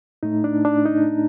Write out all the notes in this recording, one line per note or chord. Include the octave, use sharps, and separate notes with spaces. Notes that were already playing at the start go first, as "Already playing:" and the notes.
A2 A3 D#4
D4
D4
D#4